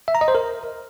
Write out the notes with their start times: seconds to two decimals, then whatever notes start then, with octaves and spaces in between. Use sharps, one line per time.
0.08 E5
0.15 A#5
0.21 D#5
0.28 C5
0.35 A#4